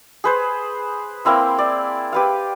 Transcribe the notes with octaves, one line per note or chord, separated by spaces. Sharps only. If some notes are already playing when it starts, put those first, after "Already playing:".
G#4 B4 C5
A#3 C4 E4 C6
D5
G4 B4 F5